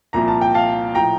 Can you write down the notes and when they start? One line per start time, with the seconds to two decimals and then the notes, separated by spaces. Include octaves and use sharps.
0.13 C2 A#2 F3 A#5
0.28 A5
0.41 G5
0.54 F5 A5
0.95 A2 F3 G5 A#5